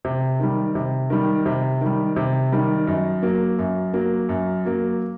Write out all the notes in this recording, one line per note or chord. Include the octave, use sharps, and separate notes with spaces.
C3
D#3 G3
C3
D#3 G3
C3
D#3 G3
C3
D#3 G3
F#2
F#3 A#3
F#2
F#3 A#3
F#2
F#3 A#3